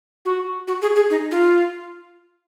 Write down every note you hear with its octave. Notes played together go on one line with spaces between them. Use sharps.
F#4
F#4
G#4
G#4
D#4
F4